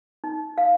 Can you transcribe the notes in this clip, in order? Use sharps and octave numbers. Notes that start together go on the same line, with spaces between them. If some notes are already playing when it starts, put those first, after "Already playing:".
D#4
F5